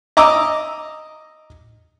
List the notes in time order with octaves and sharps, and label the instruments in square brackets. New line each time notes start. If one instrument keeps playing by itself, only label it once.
[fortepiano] D#5 A#5 D6 E6